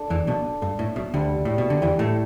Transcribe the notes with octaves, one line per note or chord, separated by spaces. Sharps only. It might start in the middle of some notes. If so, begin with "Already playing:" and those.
Already playing: D4 A4
E2 E3 D5
B1 B2 D4
A4
G2 A4
A2 E5
B1 B2 E5
D2 D3 G3
G3
A2 G3
B2
D4
D3
E2 E3 G3
A2 A3 E5